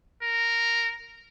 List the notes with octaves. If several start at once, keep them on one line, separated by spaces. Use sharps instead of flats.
A#4